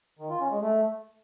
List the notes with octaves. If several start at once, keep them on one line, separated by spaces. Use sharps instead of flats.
D#3
F4
C#4
G#3
A3